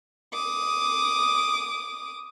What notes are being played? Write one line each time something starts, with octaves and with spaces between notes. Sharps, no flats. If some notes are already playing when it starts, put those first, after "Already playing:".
D6 D#6